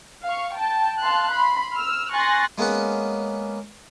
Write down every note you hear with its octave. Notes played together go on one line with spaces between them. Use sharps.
F5 C#6
G5 A5
F5 A5 C6 F#6
B5 C6
E6 F6
G#5 C6 C#6 F#6 A6 A#6
G#3 A#3 B3 C#4 F#5